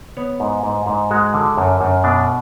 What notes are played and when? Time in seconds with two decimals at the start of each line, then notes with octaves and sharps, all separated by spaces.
0.17 B3 C#5
0.40 G#2
0.63 G#2
0.86 G#2
1.11 G#3 F#4
1.34 D3
1.57 F#2
1.81 F#2
2.04 B2 D4